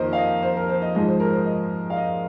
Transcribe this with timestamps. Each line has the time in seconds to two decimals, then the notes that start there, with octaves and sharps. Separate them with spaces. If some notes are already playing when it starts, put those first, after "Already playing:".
Already playing: F2 D#3 A#3 A#4 C5 D#5
0.13 F5
0.18 D#5
0.43 C5
0.57 A#4
0.69 C5
0.82 D#5
0.95 G#2 F3 G#3 D#5
1.08 C5
1.20 A#4
1.33 C5
1.46 D#5
1.90 F5
1.97 D#5